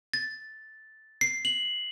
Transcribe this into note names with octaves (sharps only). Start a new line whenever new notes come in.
A6
C7
F#7